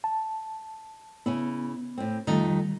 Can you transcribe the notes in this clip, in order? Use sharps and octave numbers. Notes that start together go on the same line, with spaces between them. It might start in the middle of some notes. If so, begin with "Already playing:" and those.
A5
C#3 B3 C#4 E4
A2 C4
F2 D#3 G3 A3 D#4